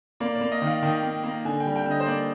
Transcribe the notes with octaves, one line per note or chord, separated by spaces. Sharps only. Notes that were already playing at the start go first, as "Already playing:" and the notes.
A#3 D5
D5
A#3
D#5
D#3
F5
D#3 G5
A#3
A#3
D3 G#5
G5
G3
G5
D3 D#5
C5
A#3 D5